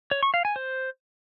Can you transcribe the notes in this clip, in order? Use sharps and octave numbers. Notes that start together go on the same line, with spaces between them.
C#5
C#6
F5
G#5
C5